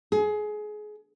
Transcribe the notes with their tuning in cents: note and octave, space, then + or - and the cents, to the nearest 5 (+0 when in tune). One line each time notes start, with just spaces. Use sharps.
G#4 +25